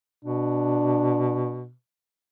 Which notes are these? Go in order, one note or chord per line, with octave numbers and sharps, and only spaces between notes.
B2 D4